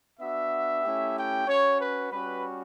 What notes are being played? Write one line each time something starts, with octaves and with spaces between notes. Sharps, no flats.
B3 D4 F#4 E5
A3 C#4 E4 G4
G5
C#4 F#4 C#5
B4
G3 C#4 F#4 B4